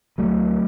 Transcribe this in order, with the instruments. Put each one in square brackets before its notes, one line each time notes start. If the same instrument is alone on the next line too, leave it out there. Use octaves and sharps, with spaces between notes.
[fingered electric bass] C#2 F#3 A3